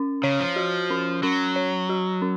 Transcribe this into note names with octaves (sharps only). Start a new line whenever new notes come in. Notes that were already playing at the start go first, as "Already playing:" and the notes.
Already playing: C#4
C#3 C#5
F3
F#4
C#4
F#3 C#4
C#5
F#4
C#4